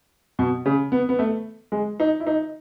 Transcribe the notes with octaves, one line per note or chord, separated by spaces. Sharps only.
B2
C#3
B3
B3
A3
G#3
D#4
E4
D#4